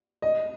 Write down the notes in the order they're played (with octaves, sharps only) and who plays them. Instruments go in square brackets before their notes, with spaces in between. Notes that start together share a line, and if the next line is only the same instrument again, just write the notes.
[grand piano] D#5